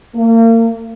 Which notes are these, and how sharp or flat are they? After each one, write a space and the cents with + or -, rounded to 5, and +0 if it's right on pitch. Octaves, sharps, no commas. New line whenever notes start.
A#3 -35